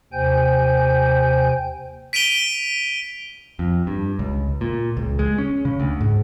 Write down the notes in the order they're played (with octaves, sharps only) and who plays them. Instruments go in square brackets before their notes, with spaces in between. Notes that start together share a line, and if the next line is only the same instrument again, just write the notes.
[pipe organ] D#2 C3 C5 G5 G#5 G6
[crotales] B6 D7 D#7 F7 G7
[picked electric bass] F2
G2
C#2
A#2
C#2
G#3
C#4
C#3
D2
G#2